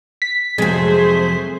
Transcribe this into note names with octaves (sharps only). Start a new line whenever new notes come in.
B6
F2 C3 F#3 G#3 A3 C4 G#4 C5